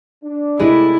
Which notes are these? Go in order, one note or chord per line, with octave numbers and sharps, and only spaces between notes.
D4
C3 G#3 A3 E4 G4 B4 D5